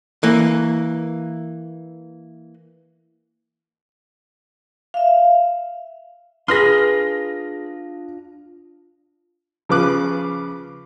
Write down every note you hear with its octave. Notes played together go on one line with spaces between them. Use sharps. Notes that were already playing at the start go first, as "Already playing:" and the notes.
E3 A#3
E5 F5
D4 F4 G#4 B4 C6 D#6 F6 A#6
C#3 F3 B4 D6 F#6